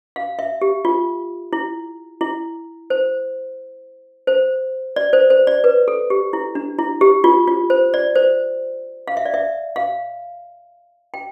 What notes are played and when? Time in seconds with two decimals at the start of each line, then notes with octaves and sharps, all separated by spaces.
0.16 F5
0.39 E5
0.61 G4
0.85 F4
1.53 E4
2.21 E4
2.90 C5
4.27 C5
4.96 D5
5.13 C5
5.30 C5
5.47 D5
5.64 B4
5.88 A4
6.10 G4
6.33 E4
6.55 D4
6.79 E4
7.01 G4
7.24 F4
7.48 F4
7.70 C5
7.94 D5
8.15 C5
9.08 F5
9.17 E5
9.26 D5
9.34 E5
9.76 F5
11.14 G5